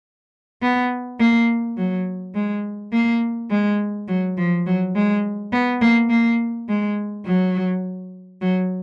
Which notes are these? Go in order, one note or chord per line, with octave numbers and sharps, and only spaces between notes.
B3
A#3
F#3
G#3
A#3
G#3
F#3
F3
F#3
G#3
B3
A#3
A#3
G#3
F#3
F#3